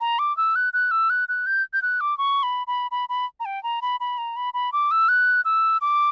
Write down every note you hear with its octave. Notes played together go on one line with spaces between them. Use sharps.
A#5
D6
E6
F#6
F#6
E6
F#6
F#6
G6
G6
F#6
D6
C#6
B5
B5
B5
B5
A#5
G5
A#5
B5
B5
A#5
B5
B5
D6
E6
F#6
E6
D6